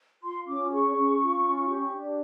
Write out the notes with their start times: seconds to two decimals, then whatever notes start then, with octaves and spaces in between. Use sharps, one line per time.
0.23 F4 C6
0.47 C#4 D6
0.71 G#4 C#6
0.96 C#4
1.21 F4
1.45 C#4
1.68 G4
1.92 D4